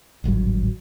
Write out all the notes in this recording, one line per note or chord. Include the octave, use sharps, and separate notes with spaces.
D1 G#1 G2 F#3